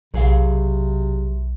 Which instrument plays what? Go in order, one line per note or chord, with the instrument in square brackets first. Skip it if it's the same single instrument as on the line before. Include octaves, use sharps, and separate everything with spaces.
[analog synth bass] B1 [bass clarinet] C3 [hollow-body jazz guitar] F#3 G#4 F5